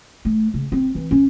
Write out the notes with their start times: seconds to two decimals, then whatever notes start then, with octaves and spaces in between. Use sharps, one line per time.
0.25 A3
0.54 C#3
0.72 C4
0.95 E3
1.11 C#4